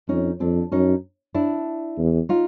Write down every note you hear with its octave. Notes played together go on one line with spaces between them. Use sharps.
F2 C#4 D#4
F2 C4 D4
F#2 C#4 D#4
D4 E4
E2
D#4 F4